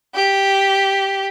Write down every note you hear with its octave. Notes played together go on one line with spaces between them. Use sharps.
G4